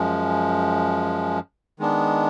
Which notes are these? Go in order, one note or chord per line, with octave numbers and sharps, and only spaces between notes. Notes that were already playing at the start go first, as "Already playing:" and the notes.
Already playing: F#2 F3 G#3
D#3 G#3 B3 D4